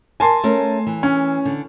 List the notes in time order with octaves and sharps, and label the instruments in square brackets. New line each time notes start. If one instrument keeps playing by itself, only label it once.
[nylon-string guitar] A#4 [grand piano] G#5 A5 C6
[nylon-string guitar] A3 C#4 A#4
E3
[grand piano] C#4
[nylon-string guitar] D3